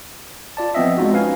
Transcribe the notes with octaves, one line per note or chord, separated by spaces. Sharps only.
F4 D5 A5
F3 B3 C4 D#5 E5
G#3 C4 D#4 F4 F#4
C#4 B4 F5 G#5